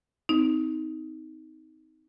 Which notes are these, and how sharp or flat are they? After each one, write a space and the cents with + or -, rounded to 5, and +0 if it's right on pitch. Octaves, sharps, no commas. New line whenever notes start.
C4 -25 D#4 +15